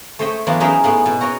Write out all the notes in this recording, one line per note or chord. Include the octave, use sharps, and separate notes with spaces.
A3 C5 C#5 D#5 G5
E3 F#3 B3 D4 F4
C#4 D#4 E4 G#4 A#4 C5
A2 B3 G#4
B2
F#4 A#4 C#5 D#5